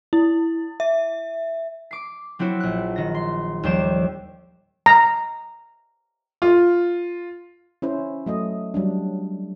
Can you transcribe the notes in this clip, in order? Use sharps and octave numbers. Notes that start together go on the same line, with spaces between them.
E4
E5
D6 C7
F#3 C4 E4 F#4
A#1 F#6
D#3 A#6
C6
D#2 F3 G3 C5 D6 E7
A#5
F4
C#4 E4 C5
F#3 A3 D#5
F#3 G3 D4